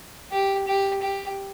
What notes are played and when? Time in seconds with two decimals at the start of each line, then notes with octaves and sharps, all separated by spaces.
0.32 G4
0.68 G4
1.02 G4